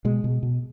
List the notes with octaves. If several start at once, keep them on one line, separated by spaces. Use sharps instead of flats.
B2 G#3
B2
B2